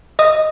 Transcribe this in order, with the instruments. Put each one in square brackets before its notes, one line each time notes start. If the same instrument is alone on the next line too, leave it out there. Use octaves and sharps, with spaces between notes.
[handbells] D#5 D#6